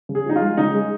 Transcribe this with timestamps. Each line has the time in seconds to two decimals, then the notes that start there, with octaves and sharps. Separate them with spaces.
0.09 C#3
0.15 G#4
0.26 F3 D#4
0.36 F4
0.42 G#3
0.57 C#3 D#4
0.75 G#3